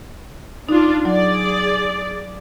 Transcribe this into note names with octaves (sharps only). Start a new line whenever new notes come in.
D4 D#4 F4
F#3 G#4 D5